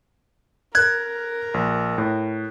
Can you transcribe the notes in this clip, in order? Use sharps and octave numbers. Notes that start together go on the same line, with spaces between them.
A#4 F#6 G#6
A#1
A2